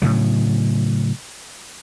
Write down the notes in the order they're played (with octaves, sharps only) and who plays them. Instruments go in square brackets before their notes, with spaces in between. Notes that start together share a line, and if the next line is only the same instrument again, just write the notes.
[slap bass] A2 C#3 F#3